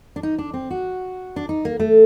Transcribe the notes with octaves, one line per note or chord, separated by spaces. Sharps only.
D4
D#4
D4
C4
F#4
D4
D#4
A#3
A3